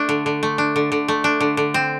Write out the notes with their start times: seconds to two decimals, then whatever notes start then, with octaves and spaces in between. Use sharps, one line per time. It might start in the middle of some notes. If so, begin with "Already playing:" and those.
Already playing: A3 D4
0.09 D3
0.26 D3
0.43 A3
0.58 D4
0.76 D3
0.92 D3
1.08 A3
1.24 D4
1.40 D3
1.57 D3
1.74 C4